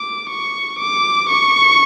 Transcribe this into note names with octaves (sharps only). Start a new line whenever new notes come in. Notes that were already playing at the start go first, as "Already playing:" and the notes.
Already playing: D6
C#6
D6
C#6